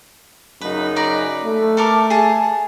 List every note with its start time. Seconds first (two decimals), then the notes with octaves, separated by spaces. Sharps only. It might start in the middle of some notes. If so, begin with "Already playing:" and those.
0.61 F#2 C#3 D#4 B4
0.96 B4 D5 A#5
1.43 A3
1.77 A4 A#4 D6
2.10 G#4 A5